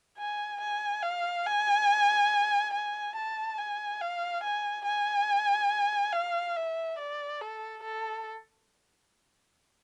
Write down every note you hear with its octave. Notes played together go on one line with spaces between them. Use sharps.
G#5
G#5
F5
G#5
G#5
A5
G#5
F5
G#5
G#5
F5
E5
D5
A4
A4